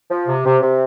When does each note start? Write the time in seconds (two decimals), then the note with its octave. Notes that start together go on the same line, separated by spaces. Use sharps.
0.11 F3
0.28 C3
0.45 C3
0.62 C3